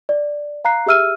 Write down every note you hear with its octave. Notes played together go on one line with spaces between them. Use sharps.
D5
F5 A#5 F#6 C7
G4 G#4 E5 E6 F6 D#7